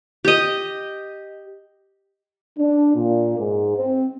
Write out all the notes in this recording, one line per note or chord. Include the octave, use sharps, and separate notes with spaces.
G4 D#5
D4
A#2
G#2
C4